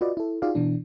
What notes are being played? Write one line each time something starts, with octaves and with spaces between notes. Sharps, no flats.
F4 F#4 B4 D5 D#5
E4 A4
D#4 F4 F#4 G#4 D5 F5
B2 E3 D4